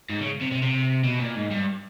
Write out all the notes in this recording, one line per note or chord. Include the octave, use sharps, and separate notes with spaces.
G#2
C#3
C3
C3
C3
B2
A#2
G#2
G2